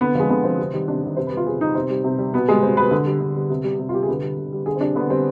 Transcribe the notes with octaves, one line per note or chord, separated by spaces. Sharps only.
D3 B3
F3 G#3
D3 B3
F3 C4
C3
D#3 G3
C3 D4
D#3 G3
C3 C5
B4
G3
F4
C3 G#4
G3 D#4
C3 C4
G3
C3
G3
B2 B3
G3 G#3
B2 C4
G3 B4
D3
G3
D3
G3
C3
G3
C3
F4
G3 G4
G#4
D3 B4
G3
D3
G3
D3 G#4
C4
G3 D4
D3 B3
G3 C4